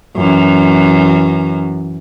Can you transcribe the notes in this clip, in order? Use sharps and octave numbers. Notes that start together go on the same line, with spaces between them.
F#2 E3